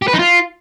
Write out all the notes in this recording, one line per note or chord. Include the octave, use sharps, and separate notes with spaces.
G4
B4
D#4
F4